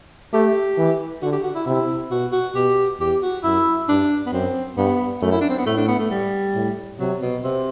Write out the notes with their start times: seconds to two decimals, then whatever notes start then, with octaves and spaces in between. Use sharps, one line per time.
0.33 A3 G4
0.78 E3
1.23 D3 F#4
1.33 G4
1.44 F#4
1.55 E4
1.66 C3 E4
2.11 B2 F#4
2.33 F#4
2.55 B2 G4
3.00 E2 G4
3.23 F#4
3.44 F#2 E4
3.89 G2 D4
4.26 B3
4.33 F#2 C4
4.77 G2 B3
5.22 F#2 A3
5.32 E4
5.41 D4
5.50 C4
5.59 B3
5.67 A2 A3
5.77 D4
5.88 B3
5.99 A3
6.11 G3
6.55 A2
7.00 C3 F#3
7.22 B2
7.44 C3